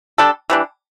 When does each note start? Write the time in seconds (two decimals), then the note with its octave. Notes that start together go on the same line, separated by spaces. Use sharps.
0.18 G3 D4 A4
0.50 E3 G3 D4